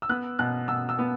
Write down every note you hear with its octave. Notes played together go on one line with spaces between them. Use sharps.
E6
B3 F#6
B2 F#6
B2 E6
E6
B3